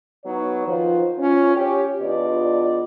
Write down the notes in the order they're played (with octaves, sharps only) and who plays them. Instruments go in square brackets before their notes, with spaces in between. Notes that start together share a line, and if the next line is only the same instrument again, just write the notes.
[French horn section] F#3 B3 D#4 C#5
D#3 F3 F4 B4 C5
C#4 F4
G4 C#5
E2 B3 D4 F4 D5 D#5